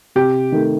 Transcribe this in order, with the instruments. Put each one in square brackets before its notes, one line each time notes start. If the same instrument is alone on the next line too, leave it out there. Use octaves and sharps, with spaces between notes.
[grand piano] C3 [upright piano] G4
[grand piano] D#3 A3